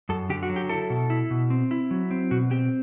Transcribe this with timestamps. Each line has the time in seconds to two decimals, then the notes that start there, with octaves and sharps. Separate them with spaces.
0.09 F#2 A4
0.29 D3 G4
0.43 F#4
0.49 F#3
0.56 G4
0.69 E4 A4
0.90 B2
1.10 E4
1.31 B2
1.50 C4
1.71 E4
1.91 F#3
2.11 C4
2.31 B2 F#4
2.51 C4 G4